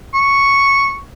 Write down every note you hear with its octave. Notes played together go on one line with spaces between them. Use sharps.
C#6